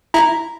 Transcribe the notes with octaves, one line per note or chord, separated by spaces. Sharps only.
E4 A#5